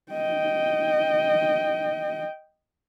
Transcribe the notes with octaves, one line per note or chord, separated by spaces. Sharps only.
D#5 G5